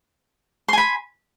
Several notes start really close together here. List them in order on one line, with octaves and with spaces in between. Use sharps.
C6 G#5 B5